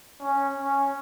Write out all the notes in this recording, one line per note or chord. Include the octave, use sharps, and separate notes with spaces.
C#4
C#4